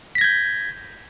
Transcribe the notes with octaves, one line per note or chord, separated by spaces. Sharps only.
G6 G#6 A#6 B6